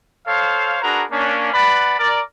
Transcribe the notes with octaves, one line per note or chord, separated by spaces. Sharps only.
A4 C5 C#5 F5
D4 F#4 G#4 A#4 B4 A#5
A#3 C#4 D4
B4 D5 F#5 A5 B5
A#4 D5